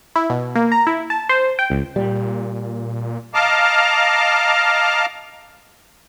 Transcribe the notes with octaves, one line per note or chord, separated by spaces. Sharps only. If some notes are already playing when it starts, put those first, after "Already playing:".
E4
B2
A#3
A#5
E4
A5
C5
G5
C#2
A#2 G3
D#5 F5 A5 A#5 D6 F6